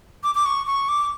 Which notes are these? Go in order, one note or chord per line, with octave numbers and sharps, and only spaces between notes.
D6
D6
C#6
C#6
D6